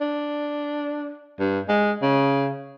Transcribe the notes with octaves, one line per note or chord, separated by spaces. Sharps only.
D4
G2
G#3
C#3